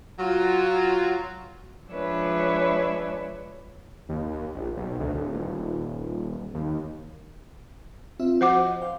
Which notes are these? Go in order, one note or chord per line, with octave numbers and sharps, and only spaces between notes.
F#3 F4
F3 G#3 D4 B4 C#5 E5
D#2
A#1
B1
D2
D1
D#1
D#2
C4 F4 E5
F3 F#4 C5 D#5 F#5 D6
C5 F5 G5